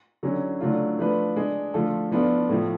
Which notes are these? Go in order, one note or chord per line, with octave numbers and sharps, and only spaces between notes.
D3 F#3 C#4
D3 F#3 A3 D4 F4
F3 A3 D4 F4 B4
G#3 D4 G#4
D3 F3 A3 F4 A4
F3 B3 D4 F4 A4
A2 F3 A3